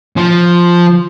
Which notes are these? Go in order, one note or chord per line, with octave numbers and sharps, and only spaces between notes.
F3